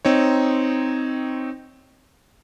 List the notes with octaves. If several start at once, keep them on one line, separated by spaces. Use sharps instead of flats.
C4 D#4 C#5